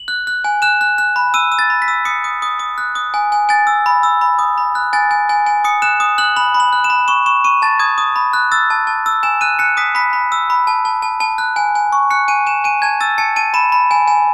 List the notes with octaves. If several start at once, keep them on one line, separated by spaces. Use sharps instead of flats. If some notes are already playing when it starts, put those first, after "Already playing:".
Already playing: F#7
F#6
F#6
G#5
F#6 E7
F#6
F#6
B5
E6 D#7
E6
A6
B5
B6
E6
D#6 C#7
D#6
D#6
D#6
F#6
D#6
G#5
G#5
G#5 A6
E6
B5
E6
B5
D#6
B5
F#6
G#5 A6
G#5
G#5
G#5
D#6 C#7
F#6 E7
D#6
F#6 F#7
B5 F#7
B5
F#7
F#6
E7
B5
C#6 E7
C#6 E7
C#6 D#7
A5 A6
D#6 G#6
D#6
B5
F#6
E6 A6
A5
A5
E6
G#5 E7
F#6 D#7
F#6 C#7
D#6 B6
B5 B6
B5
E6
B5
A5
A5
A5
A5
F#6
G#5
G#5
C#6
F#6 C#7
G#5 D#7
G#5 E7
G#5 D#7
A5 G#6
E6 A6
A5 C#7
A5 D#7
B5 E7
B5
G#5
G#5